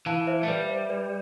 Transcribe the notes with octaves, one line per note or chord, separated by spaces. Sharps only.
E3 F5 A5
C5 E5
A3
G3 B4 D5
C5 E5
B4 D5